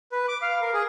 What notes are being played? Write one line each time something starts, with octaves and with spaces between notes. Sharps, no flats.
B4
D6
F5
A#4
G#4